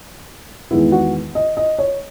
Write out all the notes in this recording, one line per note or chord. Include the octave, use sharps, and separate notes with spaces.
E2 D#3 G#3 B3 E4
F#4
D#5
D#5
C#5